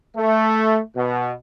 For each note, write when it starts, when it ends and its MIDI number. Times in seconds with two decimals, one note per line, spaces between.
0.16 0.80 57
0.96 1.33 47